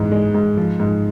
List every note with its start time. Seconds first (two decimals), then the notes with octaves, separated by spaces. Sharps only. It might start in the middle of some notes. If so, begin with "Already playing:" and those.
Already playing: G#2 E3
0.12 G#3
0.34 G#2
0.57 F3
0.80 G#2